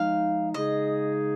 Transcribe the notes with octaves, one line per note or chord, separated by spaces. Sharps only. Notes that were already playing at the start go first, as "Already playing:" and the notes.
Already playing: F3 G#3 D#4 F5
C#3 G#3 D#4 G#4 D#5